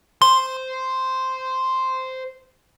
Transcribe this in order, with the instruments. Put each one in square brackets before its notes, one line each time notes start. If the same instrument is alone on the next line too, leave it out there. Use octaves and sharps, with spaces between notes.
[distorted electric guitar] C5 [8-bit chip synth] C6